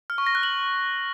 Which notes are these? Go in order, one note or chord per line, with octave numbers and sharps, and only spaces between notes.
F6
C#6
A#6
F#6
F#7